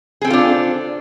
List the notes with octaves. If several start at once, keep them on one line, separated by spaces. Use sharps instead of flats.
C4 D4 F4 G#4 A4